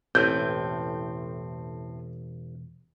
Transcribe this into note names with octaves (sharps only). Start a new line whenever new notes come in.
E1 A1 A2 C4 G6